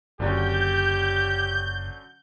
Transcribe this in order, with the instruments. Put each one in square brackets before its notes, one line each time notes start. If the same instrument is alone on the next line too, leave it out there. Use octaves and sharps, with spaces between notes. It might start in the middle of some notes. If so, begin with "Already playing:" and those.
[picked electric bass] F#1 [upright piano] D3 F#3 C#4 [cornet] G4 [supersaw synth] G6